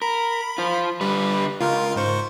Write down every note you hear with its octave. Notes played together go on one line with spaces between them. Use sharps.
A#4 B5
F4 C5
D3 G3 B4
C#2 F4 A#4 F5
G#2 C5 C#6